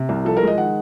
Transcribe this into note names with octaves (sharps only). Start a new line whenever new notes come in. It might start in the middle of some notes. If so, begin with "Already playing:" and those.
Already playing: C3
C2
F3 A4
A#4
G#3 D#5
D#3 F#5